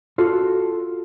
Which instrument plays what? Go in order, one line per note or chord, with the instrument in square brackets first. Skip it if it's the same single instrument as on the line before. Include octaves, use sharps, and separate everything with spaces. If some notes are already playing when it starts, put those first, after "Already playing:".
[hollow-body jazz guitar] F4 F#4 A4